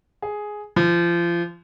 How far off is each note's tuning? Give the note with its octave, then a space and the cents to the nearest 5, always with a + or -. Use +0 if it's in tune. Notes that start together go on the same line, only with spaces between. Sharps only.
G#4 +5
F3 -30